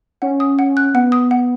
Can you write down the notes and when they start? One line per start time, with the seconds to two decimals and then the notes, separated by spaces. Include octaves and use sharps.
0.22 C#4 F#5
0.40 D#6
0.59 F#5
0.77 F#6
0.94 B3 F#5
1.12 D#6
1.31 F#5